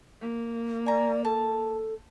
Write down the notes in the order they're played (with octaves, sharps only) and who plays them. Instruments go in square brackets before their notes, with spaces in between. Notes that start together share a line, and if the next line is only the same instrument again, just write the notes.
[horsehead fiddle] A#3
[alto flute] D5 [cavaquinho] G#5 A#5
[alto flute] A4 [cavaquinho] A5